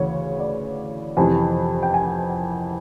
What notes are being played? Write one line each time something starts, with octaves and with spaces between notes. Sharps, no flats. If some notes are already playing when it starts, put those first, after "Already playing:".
Already playing: D2 C#3 E3 C#5
D5
F2 C3 E3 G#5
G5
G#5